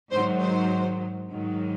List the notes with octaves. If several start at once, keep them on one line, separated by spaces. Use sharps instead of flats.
G#2 D#3 F#3 C5
C5
G#2 D#3 F#3